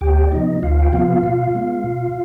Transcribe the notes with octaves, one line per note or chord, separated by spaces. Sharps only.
D2 G4 G5
D5
C3 F3 B3 D#4 D#5
D2 F4 F5
G5
C3 F3 B3 F4 F5
B2 F4 F5
G#3 B3
B2